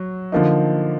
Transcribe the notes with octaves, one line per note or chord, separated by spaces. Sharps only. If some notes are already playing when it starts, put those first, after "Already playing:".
Already playing: F#3
D3 F3 A#3 D#4